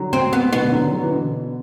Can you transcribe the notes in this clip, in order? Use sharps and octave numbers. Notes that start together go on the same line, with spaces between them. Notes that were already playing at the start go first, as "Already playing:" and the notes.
Already playing: D3 F#3
C4
B3
B2 D3 B3
D3 F#3
D3 F#3
E3
B2 D3